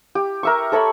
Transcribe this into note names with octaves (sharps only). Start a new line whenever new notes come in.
G4
A#4 E5 C#6
A4 C#5 E5 B5